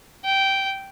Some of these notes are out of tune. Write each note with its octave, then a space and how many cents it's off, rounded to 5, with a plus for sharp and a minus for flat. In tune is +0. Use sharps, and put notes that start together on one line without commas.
G5 -10